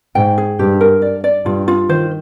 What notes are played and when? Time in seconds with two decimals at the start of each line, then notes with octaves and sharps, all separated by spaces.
0.15 G#2 G5
0.38 G#4
0.59 G2 G4
0.81 A#4
1.02 D5
1.24 D5
1.45 G2 F4
1.68 F4
1.89 D#3 C5